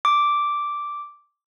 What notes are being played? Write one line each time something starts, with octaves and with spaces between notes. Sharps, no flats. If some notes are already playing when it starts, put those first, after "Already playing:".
D6